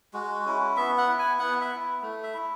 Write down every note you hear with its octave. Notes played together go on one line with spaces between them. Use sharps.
G#3 F#4
C#4 E4
B3 E5
F#5
E4
G#5
B3 F#5
E5
E4
A3
E5
E4